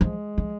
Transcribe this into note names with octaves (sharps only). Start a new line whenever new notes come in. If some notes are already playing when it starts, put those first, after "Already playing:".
F3 G#3
F3